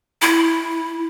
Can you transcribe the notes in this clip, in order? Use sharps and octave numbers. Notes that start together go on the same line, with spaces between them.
E4